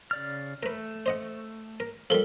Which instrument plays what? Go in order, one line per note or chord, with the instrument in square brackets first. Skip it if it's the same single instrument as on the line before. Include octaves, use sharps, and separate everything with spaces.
[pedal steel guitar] C#3 D5 F6
[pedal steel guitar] A3 [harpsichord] A#4 B4
[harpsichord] C5 D#5 F#5
A#4
[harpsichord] F3 G3 [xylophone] A4 A#4